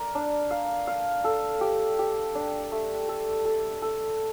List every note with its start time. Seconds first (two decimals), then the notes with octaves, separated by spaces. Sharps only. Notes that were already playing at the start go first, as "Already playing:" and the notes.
Already playing: A#4 D5
0.15 D4
0.51 F5
0.87 F5
1.24 A4
1.61 G4
1.99 G4
2.35 D4
2.72 A3
3.09 A4
3.45 A4
3.82 A4